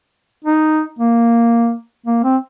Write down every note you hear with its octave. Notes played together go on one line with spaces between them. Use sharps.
D#4
A#3
A#3
C4